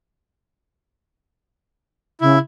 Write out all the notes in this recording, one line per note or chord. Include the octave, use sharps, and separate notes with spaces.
C#3 E4